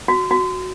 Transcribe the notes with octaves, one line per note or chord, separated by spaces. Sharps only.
F#4
F#4